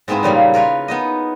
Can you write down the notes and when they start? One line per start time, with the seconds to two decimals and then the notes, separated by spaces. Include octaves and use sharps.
0.08 G#2 G#3 B3 C4 E4 G#4
0.23 A#2 C#3 G3 A#3
0.54 F4 A#4 B4 C#5
0.88 B3 D#4 D#5